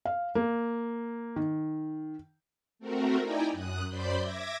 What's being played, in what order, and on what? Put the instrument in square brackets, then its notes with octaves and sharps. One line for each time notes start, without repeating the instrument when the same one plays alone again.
[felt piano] F5
A#3
D#3
[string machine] A3 C4 F#4 A#4
D#4 E4 D5 G5 G#5 A#5
F#2 D#6 F#6
F#2 C5 D5 B5 C6 G6
E5 D6 G#6 A#6